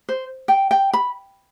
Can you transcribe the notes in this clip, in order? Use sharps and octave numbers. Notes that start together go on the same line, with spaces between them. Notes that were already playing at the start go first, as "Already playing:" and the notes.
C5
G5
G5
B5